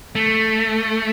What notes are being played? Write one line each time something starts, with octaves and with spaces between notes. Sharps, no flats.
A3